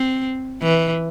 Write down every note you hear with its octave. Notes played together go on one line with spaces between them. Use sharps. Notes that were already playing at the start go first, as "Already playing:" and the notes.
Already playing: C4
E3